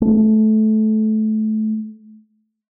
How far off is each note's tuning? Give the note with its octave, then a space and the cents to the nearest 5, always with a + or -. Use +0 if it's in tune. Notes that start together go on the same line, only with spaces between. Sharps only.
A3 -20